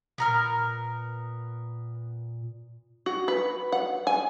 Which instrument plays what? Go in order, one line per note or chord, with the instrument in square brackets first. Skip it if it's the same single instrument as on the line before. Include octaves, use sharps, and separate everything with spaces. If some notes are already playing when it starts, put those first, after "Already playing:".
[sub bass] A#2 [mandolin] B3 A#4 F6
[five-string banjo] F#4
B4
F#5
G#5